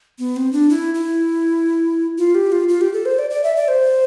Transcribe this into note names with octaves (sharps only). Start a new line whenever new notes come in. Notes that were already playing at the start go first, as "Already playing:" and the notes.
B3
C4
D4
E4
E4
F4
G4
F4
F4
G4
A4
C5
D5
D5
E5
D5
C5